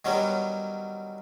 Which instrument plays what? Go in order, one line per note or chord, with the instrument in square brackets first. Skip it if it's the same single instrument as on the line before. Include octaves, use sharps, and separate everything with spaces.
[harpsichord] D#3 F#3 G3 B3 C#4